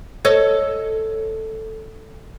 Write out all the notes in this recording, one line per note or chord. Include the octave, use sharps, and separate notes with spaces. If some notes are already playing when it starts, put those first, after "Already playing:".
A4 C#5 D#5